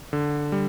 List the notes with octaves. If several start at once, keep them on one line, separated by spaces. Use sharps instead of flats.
D3
G3